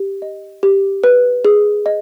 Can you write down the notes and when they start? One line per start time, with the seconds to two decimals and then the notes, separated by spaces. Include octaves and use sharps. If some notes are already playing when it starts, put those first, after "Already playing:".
Already playing: G4
0.22 D#5
0.63 G4
1.04 B4
1.45 G#4
1.86 D#5